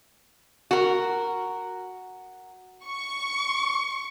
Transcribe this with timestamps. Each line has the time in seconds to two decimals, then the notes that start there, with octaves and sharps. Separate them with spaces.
0.71 F#4 A#4
2.84 C#6